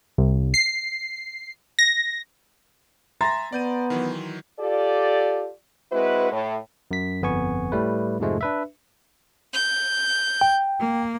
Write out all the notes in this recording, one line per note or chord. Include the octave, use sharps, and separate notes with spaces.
C2
C7
A#6
E5 G#5 A#5 C6 A6 A#6
B3 D5 G6 D#7
D#3 E3 F#3
F4 G4 A4 D5
G#3 C4 E4 F#4 B4
A2
F#2 B6
G1 F2 B3 G#5 C#6
A2 G3 A3 B4
F2 G#2 C3 F3 G#3 A3
D4 B4 E5
G6
G5
A#3